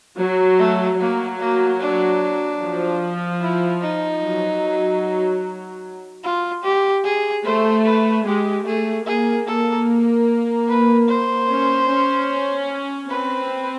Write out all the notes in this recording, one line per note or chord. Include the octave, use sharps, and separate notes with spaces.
F#3
A3
F#3 A#3
A#3
D4
F3
E4
D#4
F#3
F4
G4
G#4
A3 C5
B4
G#3 G4
A3 G#4
A#3 G#4
A4
B4
C5
C#4
C#4
C4 B4